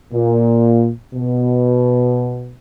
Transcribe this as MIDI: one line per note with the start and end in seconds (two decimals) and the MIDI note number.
0.13 0.90 46
1.14 2.54 47